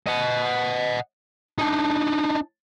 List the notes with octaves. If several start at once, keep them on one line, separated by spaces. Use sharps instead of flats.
D#5 F#5
D4 D#4